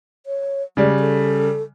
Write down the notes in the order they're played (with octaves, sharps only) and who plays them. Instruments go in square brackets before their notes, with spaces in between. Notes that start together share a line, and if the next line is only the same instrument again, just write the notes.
[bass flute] C#5
[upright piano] C#3 G3 [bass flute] G#3
[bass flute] A4